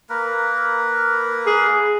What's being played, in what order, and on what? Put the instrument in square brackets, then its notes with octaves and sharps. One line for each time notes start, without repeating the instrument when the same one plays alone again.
[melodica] A#3 A#4 B4
[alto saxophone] G#4